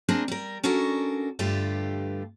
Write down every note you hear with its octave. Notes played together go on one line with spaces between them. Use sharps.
A#3 C4 D4 G#4 A#4 A5
G3 A#4
C#4 D4 F#4 A4 A#4
G2 D3 A3 F4 G4 B4